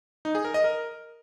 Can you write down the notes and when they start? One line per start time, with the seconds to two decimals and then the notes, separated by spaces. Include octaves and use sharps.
0.25 D#4
0.35 G#4
0.45 A#4
0.54 D#5
0.64 A#4